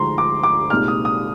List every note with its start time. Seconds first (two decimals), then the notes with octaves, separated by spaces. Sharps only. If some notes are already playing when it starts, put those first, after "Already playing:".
Already playing: D2 D3 F3 G#3 D#4 A#5 C6
0.18 D6
0.43 D6
0.70 C2 A#2 G#3 D#4 F6
0.88 D#6
1.05 D#6